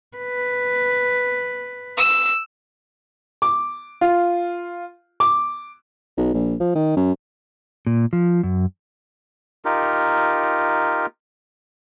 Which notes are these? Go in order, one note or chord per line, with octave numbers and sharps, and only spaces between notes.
B4
E6
D6
F4
D6
B1
A#1
F3
D#3
F#2
A#2
F3
F#2
D#4 F4 G4 A#4